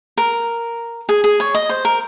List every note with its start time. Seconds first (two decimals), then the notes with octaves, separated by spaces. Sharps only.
0.17 A#4
1.09 G#4
1.24 G#4
1.40 C#5
1.55 D#5
1.69 C5
1.85 A#4